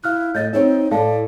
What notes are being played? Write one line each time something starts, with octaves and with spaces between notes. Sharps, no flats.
E4 F5 F6 F#6
A2 D#5 G6 A6
C4 D#4 C#5 E5
A2 A3 D5 F5 A5